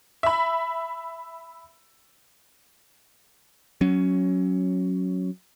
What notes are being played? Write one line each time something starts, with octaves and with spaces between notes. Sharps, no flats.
E5 B5
F#3 C#4